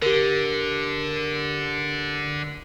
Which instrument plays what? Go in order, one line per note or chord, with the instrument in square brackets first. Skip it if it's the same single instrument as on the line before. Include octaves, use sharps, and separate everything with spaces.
[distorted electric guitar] D3 [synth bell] G4 A#4